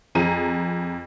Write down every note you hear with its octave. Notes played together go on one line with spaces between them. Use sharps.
F2 G#4 A#5 D#7